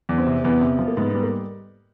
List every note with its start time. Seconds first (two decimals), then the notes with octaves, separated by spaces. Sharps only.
0.09 E2
0.17 C4
0.26 C3
0.44 E2 B3
0.61 C3
0.79 F3
0.88 A#3
0.97 G#2 B3
1.10 G3 B3
1.23 A#3